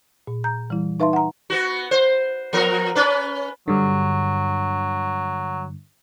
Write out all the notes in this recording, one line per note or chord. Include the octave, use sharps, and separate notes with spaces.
A#2
A#5 G6
E3 G3 E4
D#4 B4 E5 F5 A5 C6
F#5 A#5
B3 F#4
C5
F3 B3 A#4
C#4 B4
G2 D3 F#3